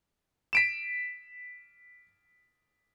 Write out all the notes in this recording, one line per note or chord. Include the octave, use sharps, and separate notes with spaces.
B6 D7 E7